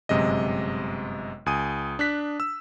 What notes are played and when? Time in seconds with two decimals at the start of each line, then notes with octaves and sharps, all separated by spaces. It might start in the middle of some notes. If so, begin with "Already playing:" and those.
0.09 G1 F#2 C3 G#3 D#5
1.46 C#2 G#5 D#6 D#7
1.99 D4 F#6 B6
2.40 E6